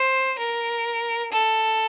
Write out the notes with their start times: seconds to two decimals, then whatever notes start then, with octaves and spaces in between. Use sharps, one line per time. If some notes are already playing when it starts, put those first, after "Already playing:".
Already playing: C5
0.38 A#4
1.32 A4